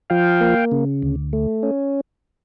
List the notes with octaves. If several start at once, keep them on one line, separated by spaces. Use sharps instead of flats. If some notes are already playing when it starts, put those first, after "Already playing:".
F3 F5 G5
A#3
C#3
D2
A3
C#4